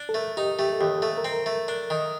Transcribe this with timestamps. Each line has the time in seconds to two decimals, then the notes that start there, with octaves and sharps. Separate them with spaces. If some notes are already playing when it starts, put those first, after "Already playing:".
Already playing: D4
0.09 A4
0.14 A3 A#4
0.37 D#4 G4
0.59 A3 G4
0.72 A4
0.81 D#2 G4
1.02 A3 A4
1.17 A#4
1.25 C4
1.32 A#4
1.46 A3
1.68 D4
1.90 D#3